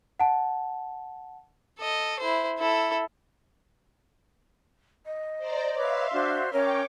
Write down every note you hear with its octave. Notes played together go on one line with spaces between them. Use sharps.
F#5 A5
A4 D#5
E4 C5
E4 A4
D#5
C5 D5 A#5
B4 C#5 E5 F5 C6 D6
D4 F#4 C5 D5
C#4 A#4 C#5 G5 C#6 D6